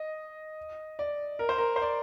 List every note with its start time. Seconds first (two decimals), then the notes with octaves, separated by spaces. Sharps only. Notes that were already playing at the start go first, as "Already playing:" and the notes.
Already playing: D#5
0.99 D5
1.39 A#4
1.49 C5
1.58 A#4
1.76 C5
1.82 D5